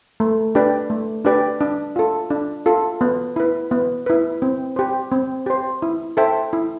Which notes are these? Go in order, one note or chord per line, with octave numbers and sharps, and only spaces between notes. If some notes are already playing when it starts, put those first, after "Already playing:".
A3
D4 G4 B4 D5
A3
D4 G4 B4 D5
D4
F4 A4
D4
F4 A4
B3
E4 B4
B3
E4 B4
C4
G4 C5
C4
G4 C5
E4
A4 C5 E5 G5
E4